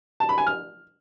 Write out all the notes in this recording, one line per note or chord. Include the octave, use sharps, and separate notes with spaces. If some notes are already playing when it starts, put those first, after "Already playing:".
A5
B5
G#5
F6